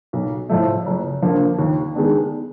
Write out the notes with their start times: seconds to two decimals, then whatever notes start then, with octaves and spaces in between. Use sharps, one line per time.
0.13 B1
0.50 A2 F3 A3
0.86 F#1
1.22 F2 D3 F3 A#3
1.59 D#2
1.95 D#3 G#3 B3 D4